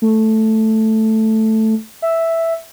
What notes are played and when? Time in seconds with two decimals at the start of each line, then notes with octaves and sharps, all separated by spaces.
0.02 A3
2.02 E5